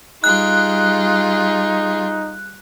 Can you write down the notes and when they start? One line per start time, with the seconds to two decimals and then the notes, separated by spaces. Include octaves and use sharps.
0.24 G3 D#4 F4 G#4 F#6